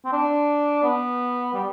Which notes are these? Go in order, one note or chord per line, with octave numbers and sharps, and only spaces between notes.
C4
D4
B3
G3